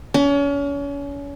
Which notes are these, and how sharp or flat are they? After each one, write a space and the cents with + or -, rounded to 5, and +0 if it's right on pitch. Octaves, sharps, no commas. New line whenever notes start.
C#4 +35